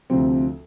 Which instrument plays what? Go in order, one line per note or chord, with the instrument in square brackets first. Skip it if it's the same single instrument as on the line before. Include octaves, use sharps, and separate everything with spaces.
[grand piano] D2 C3 F3 C4